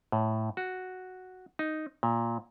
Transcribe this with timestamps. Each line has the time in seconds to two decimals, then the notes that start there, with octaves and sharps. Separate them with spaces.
0.12 A2
0.57 F#4
1.59 D#4
2.03 A#2